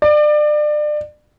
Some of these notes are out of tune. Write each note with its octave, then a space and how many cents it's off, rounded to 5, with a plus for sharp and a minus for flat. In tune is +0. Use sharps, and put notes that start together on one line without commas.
D5 +30